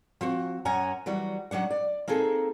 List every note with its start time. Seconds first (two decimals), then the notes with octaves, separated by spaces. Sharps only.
0.21 F3 C4 F#4
0.65 F#2 C#4 F#5 G#5 A#5
1.06 E3 F#3 G3 F#4
1.51 F#3 C#4 D4 F#5
1.70 D5
2.08 A#3 C4 D#4 G#4 A4